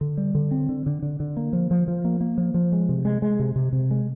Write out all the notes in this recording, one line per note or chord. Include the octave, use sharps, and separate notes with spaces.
D3
G3
D3
C4
D3
D3
D3
D3
A#3
F3
F3
F3
A#3
A#3
F3
F3
G#3
C3
G#3
G#3
C3
C3
C3
G#3